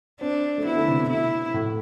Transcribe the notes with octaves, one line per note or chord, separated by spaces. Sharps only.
C4 D4
A3
B3 E4
D3
C3
B2
E4
A2